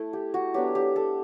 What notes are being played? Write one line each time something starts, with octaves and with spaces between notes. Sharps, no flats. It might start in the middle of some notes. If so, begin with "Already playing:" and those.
Already playing: A3 E4 A4
G4
F#4
F#3 B3 D4 G4
G4
A4